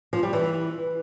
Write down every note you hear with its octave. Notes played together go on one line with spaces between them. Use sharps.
F3
G3
E3